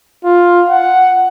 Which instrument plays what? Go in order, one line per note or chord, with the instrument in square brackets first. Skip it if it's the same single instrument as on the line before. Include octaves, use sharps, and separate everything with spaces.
[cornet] F4
F#5